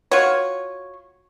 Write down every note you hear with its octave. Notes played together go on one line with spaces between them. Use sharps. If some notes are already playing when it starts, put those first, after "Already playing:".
F4 F#4 C#5